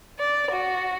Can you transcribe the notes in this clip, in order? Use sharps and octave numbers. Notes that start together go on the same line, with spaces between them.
D5
F#4